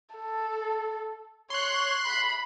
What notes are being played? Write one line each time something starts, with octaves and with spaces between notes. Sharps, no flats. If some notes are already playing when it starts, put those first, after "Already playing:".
A4
C#5 C6 F#6
B5